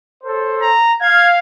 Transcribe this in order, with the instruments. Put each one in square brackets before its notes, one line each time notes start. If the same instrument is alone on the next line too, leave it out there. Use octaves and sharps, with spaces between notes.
[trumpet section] A4 C5 C#5
[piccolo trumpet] A#5
[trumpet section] F5 [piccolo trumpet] G#6